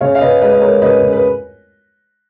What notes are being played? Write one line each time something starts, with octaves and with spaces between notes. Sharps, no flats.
C#3 C#5 F5
F5
C#3 B4 D#5
G#3 B4 D#5
D#5
G#3 A#4 C#5
C#3 B4 D#5
C#3
B4